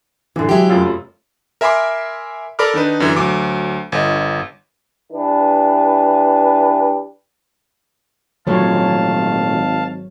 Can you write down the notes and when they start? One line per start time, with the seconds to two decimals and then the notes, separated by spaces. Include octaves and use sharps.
0.36 F#2 A2 D3 E3
0.49 F#3 G#3 E4 G4
0.69 F1 F#2 F4
1.61 A#4 E5 G#5 B5 C6 D6
2.59 A4 A#4 D5 B5 D6 F6
2.74 D#3 D4 D#4 B4
3.00 F#2 D3 E3
3.16 D2 F#3 D6
3.92 G1 D#5
5.11 E3 D4 G4 B4
8.47 G#1 A#2 F3 F#3 A3 C#5 F5 A5